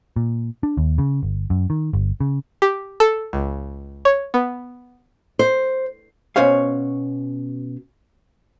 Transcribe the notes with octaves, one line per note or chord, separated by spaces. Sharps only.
A#2
D4
D#2
C#3
G1
F#2
D#3
G1
C#3
G4
A4
C#2
C#5
B3
C5
B2 C#4 C5 C#5 F5